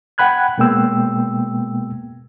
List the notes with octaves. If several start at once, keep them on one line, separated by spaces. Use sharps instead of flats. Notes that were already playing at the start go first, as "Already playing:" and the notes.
F#5 G5 B5 F#6 G#6
B2 G#3 A#3 B3 G5 E6